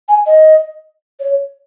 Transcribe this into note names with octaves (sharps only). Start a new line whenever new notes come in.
G#5
D#5
C#5